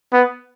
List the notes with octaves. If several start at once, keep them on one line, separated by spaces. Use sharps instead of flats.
B3